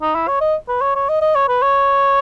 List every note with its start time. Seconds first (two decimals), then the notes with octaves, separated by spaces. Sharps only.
0.02 D#4
0.15 E4
0.28 C#5
0.41 D#5
0.69 B4
0.81 C#5
0.96 C#5
1.09 D#5
1.22 D#5
1.35 C#5
1.48 B4
1.62 C#5